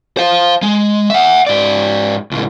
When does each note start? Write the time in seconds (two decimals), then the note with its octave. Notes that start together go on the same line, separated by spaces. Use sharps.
0.17 C5 F5
0.62 G#3
1.10 E5 F#5
1.47 G#2 D5
2.31 C#2 A2